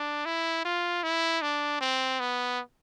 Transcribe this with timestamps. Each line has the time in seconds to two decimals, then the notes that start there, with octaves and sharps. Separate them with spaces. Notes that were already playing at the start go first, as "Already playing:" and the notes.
Already playing: D4
0.25 E4
0.65 F4
1.03 E4
1.42 D4
1.81 C4
2.20 B3